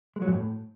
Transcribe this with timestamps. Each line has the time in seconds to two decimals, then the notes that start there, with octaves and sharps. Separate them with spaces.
0.16 G#3
0.22 F#3
0.28 G#2
0.33 A2